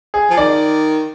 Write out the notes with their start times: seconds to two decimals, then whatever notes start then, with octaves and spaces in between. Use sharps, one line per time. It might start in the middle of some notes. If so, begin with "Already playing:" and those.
0.14 G#4
0.30 F3
0.37 D#3 D5